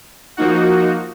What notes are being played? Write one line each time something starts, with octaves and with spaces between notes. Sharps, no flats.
F3 A#3 D#4 F#4